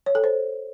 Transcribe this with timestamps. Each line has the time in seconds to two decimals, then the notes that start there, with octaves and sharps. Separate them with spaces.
0.06 C#5
0.15 A4
0.24 C5